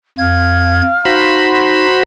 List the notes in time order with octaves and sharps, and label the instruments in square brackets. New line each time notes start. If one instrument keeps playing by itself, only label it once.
[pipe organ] F2 G#6 [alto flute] F5
[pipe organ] D#4 [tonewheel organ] F#4 C5 B5